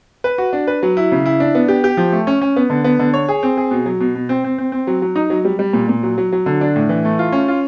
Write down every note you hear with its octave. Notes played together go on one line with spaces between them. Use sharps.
B4
F#4
D4
B4
F#3
E4
C#3
E4
D4
B3
G4
G4
F3
A3
C#4
C#4
B3
D3
B3
D3
C#5
G#4
C4
G#4
B2
F#3
B2
B2
C4
C4
C4
C4
F#3
F#3
D#4
F#3
G3
G3
A#2
A#2
F#3
F#3
F#3
D3
D4
A2
E3
A3
F4
C#4
F4